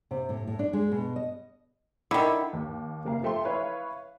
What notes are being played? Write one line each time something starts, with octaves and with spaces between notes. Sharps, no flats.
C3
A2
A2
D4
G#3
B2
D#5
D3 D#3 E4
D#2
F#1 A#3 F5
F3 A3 G5 C6
E4 B4 C#5 F5